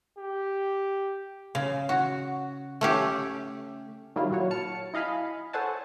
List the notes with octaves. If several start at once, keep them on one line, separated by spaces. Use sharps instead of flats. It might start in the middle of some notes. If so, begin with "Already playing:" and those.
G4
C#3
F#4
A3 C#4 G4
D#3 F#3 G3 E4 F4
A#2 F#4 C#5
A5 F6 C#7
E4 D#5 F5 G#5 B5
A4 C5 C#5 F#5 G#5 A5